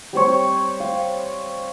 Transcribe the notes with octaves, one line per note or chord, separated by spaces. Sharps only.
G3 C4 C#5
F5